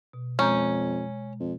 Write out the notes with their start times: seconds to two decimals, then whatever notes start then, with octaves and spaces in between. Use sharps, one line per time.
0.13 B2
0.39 F2 G#3 C#4 A#5 G6
1.40 F2